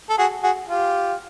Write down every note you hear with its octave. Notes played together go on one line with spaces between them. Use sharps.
A4
F#4 G#4
F#4 G#4
F4 G4